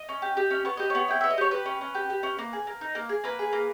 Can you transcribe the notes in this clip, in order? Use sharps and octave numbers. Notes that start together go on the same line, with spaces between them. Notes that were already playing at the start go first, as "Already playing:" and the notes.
Already playing: D#5
C#4
G4
G4
C#4
B3 C#5
G4 D#5
B3 C#5
E4 G5
B3 E5
D#5
G4 C#5
G4 B4
C#4
C#4
G4
G4
C#4
A#3
G#4
A#3
D#4
A#3
G#4
A#3 B4
G#4
A#3